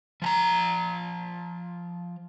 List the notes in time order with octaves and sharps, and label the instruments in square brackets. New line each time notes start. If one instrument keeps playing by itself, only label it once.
[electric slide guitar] F3 A5 A#5